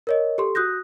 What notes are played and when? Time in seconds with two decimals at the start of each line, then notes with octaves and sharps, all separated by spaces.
0.07 A#4 C#5 D#5
0.38 G4 A4 C6
0.55 F#4 D#6 F#6 G6 A#6